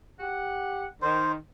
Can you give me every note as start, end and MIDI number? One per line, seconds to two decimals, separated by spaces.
0.19 0.85 67
0.19 0.85 78
1.02 1.33 51
1.02 1.32 72